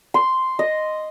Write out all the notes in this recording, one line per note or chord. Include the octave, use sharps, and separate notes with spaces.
C6
D#5